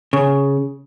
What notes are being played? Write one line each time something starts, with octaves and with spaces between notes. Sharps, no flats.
C#3